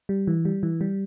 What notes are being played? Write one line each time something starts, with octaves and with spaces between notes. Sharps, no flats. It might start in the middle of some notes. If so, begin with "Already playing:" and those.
G3
E3
G3
E3
G3